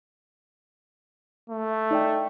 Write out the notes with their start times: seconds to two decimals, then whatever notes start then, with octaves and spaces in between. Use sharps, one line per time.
1.50 A3
1.91 D#4 D5 G5